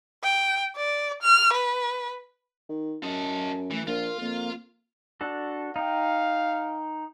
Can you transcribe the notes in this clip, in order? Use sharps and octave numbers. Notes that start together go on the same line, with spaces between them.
G5
D5
F6
B4
D#3
F#2 A4 D#5
E3 A3
A#1 F4 A#4
F2 A#3
D4 F#4 A4
D#4 F5 G5